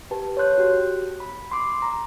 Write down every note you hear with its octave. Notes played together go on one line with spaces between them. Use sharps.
G4 B4 A5
C#5 A5 C6 F#6 G6
F#4 G4
B5
C6 D6
A#5